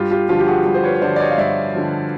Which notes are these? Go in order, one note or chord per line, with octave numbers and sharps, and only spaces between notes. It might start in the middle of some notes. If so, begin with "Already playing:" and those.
Already playing: G2 F4 G4
F4 G4
D3 F3 F4 G4
G4
F#4 G#4
G2
C5
B4 C#5
C#5
D3 F3 C5 D5
D5
C#5 D#5
F5
G2 D5 E5
D3 F3